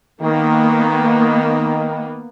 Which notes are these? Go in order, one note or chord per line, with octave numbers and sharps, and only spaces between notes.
D#3 A#3 B3